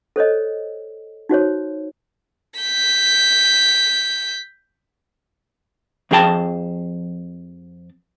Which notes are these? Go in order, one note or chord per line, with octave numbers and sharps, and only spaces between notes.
A4 C5 C#5 D#5
D#4 F#4 C5 C#5
G6 B6
F2 F3 G#4 G5 A5